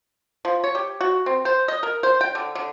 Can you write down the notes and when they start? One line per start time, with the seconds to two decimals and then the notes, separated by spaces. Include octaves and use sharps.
0.45 F3
0.64 C#5
0.75 G4
1.01 F#4
1.26 C4
1.45 C5
1.68 D#5
1.83 A#4
2.03 C5
2.21 G5
2.35 D3
2.55 D3